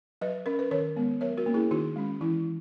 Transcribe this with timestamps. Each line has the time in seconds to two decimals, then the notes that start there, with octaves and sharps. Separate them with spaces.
0.21 F#3 B4 D#5
0.46 C#4 A#4
0.59 B4
0.71 D#3 A#4 C#5
0.96 G#3 B3
1.21 F#3 A#4 C#5
1.37 F#4 A#4
1.46 A#3 C#4
1.54 E4 G#4
1.71 D#3 D#4 F#4
1.96 G#3 C#4
2.21 E3 E4